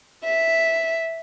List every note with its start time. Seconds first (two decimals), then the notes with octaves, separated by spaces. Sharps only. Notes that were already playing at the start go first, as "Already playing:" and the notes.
0.24 E5